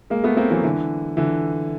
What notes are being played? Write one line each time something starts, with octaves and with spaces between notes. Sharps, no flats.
G#3 A#3
A3 B3
A#3 C4
E3 F#3
D3 E3
D3 E3